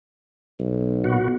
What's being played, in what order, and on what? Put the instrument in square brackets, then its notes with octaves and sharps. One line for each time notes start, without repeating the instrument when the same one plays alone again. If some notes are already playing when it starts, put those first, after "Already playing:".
[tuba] B1
[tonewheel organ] A#2 B3 F#4